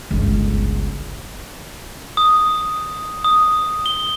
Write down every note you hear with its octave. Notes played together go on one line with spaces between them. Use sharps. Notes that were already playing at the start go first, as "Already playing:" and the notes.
G1 C#2
D#6
D#6
G7